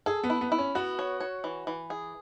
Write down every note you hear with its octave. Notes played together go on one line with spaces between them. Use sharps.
G#4 A4
B3
E4
B3
E4
C#4
B3 F#4
C#5
C#5
E3
E3
G#4